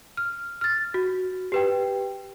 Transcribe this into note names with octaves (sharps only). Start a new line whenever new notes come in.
F6
F6 A6
F#4
G4 B4 G5